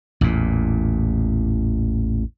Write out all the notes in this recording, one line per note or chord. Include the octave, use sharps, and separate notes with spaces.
A1 E2 A#2